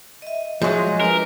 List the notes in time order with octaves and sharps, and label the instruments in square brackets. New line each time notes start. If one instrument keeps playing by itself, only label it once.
[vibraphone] D#5 E5
[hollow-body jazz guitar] F3 F#3 [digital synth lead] G#3 [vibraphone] D#5 E5
[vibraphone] D4 B4 [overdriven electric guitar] A#4